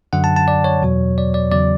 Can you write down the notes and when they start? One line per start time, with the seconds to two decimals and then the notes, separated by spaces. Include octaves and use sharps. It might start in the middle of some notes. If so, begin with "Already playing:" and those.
0.13 F#2 D3 F#3 F#5
0.24 A5
0.36 A5
0.48 D5
0.64 C#5
0.82 E2 B2 F#3
1.18 D5
1.34 D5
1.52 E2 C#3 F#3 D5